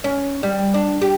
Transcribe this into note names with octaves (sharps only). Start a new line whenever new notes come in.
C#4
G3
D4
G4